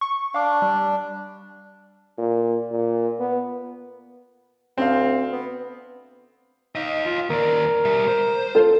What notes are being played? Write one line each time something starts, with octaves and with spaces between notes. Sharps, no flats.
C#6
D4 F5 D6
G3
A#2
A#2
B3
D2 C4 F5
B3
D#4 D#5 F5
F4
D#2 A#4 D5
G3 E5
C5
F4 A4